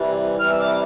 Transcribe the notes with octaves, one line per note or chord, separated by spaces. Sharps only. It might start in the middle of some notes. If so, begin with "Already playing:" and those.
Already playing: C3 E3 G3
C3 E3 G3 F6
E6
D6